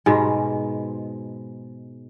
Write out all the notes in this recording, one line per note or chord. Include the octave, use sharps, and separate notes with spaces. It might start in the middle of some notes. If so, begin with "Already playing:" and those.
G#2 B2 G#3